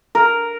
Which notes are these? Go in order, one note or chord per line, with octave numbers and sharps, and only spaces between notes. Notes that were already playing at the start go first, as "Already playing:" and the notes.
A#4